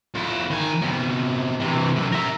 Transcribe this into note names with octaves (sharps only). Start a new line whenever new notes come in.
F2 E4
D#3 G#5
C3 B3
C3 E3
F#2 A2
A#4 E5